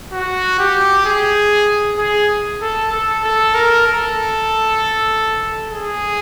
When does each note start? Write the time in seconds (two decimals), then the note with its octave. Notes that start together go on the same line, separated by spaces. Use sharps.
0.12 F#4
0.59 G4
1.05 G#4
1.99 G#4
2.61 A4
2.92 A4
3.24 A4
3.55 A#4
3.86 A4
5.72 G#4